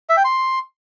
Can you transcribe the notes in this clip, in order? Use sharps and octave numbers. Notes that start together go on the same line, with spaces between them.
E5
G5
C6